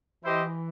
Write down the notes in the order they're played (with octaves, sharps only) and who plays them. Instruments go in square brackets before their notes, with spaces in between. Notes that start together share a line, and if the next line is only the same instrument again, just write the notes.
[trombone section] E3 [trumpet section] E4 G4 C5 D#5